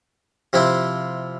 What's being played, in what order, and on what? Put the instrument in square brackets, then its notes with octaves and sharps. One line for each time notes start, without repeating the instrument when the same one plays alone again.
[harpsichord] C3 F3 C4 E4